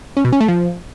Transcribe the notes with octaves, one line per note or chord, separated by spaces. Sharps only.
C#4
B2
C#4
A3
F3